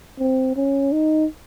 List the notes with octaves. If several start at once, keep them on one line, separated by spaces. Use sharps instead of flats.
C4
C#4
D#4